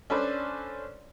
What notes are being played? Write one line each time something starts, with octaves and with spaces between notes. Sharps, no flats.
C#4 D4 A4 B4 C5 D5